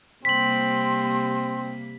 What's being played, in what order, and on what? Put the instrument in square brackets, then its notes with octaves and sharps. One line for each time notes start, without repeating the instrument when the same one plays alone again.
[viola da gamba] C3 G3 A#3 [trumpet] C4 [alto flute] C6 [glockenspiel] B6 F#7